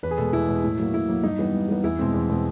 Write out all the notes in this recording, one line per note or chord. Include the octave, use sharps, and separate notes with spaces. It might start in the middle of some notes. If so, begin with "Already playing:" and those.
E2 B4
G#4
B2 G#3 A4
E2 E4
B2 G#3
A2
F#3 A#3
A2 E4
F#3 A#3
G2 D#4
E3 G3 B3
G2
E3 G3 B3
E2 E4
B2 G#3 C4
E2
B2 G#3 C4